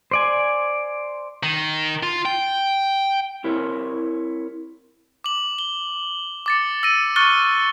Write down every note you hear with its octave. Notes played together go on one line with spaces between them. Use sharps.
C5 D5 G#5
D#3
F4
G5
C4 E4 A#4 C#5
D6 F#7
G7
D6 A6 C#7
E6 A#6 D#7
C#6 F6 F#6 A6 C#7 G7